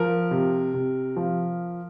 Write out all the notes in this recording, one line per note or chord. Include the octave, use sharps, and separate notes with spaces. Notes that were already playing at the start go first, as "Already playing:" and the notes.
Already playing: F3 A#4
C3
C3
F3